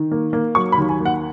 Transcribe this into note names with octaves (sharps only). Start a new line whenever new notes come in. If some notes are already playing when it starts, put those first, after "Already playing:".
Already playing: D#3
A#3
A#3
F#3 C#6
B5
D#2
G#5
A#3
F#5